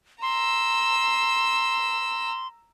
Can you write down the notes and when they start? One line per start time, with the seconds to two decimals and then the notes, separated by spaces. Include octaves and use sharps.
0.22 A#5 C6 E6